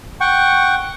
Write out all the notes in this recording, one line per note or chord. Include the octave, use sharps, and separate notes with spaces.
F#5 G5 C#6